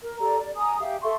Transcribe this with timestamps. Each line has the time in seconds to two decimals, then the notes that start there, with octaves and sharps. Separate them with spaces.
0.02 A#4
0.20 G4 A4 D5 A#5
0.39 D5
0.56 G#5 A#5 D#6
0.80 G4 E5 F5
1.03 A4 E5 C6 C#6